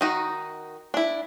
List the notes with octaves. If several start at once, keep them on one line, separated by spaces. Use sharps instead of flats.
D#3 D#4 F#4
D4 E4